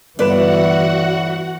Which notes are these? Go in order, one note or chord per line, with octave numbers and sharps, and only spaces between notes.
G1 E3 F#4 B4 D5 F#5 E7